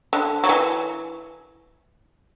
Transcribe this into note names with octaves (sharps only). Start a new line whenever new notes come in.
D3
F#3
E3